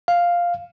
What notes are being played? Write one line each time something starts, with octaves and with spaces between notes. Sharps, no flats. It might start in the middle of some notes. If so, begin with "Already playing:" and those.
F5